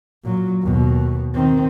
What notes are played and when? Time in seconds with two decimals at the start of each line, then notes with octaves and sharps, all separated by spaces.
0.24 A#2 F#3
0.61 D#2 B2
1.34 D#3 C4